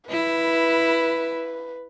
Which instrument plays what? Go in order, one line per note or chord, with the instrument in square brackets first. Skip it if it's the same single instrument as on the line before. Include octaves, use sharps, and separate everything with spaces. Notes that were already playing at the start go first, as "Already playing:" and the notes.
[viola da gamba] E4 [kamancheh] B4